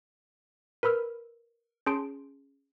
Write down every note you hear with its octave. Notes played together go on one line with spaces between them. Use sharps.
A#4 B4 B5 E6 F6
C#4 G#4 A5 C6 D7